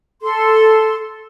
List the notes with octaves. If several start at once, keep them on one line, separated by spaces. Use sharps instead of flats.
A4 C6